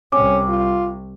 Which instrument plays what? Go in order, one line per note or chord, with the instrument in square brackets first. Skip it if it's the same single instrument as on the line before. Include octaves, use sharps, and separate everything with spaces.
[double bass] C2 C3 [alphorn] C#4 [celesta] D6
[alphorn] F4